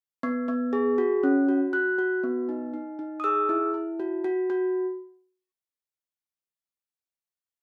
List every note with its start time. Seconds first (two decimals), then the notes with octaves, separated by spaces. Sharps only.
0.23 B3
0.48 B3
0.73 G#4
0.98 F#4
1.23 C#4
1.49 F#4
1.73 F#4 F#6
1.99 F#4
2.24 B3
2.49 D#4
2.74 D#4
2.99 D#4
3.20 D#6
3.24 G#4 E6
3.49 E4
3.74 E4
4.00 F#4
4.24 F#4
4.50 F#4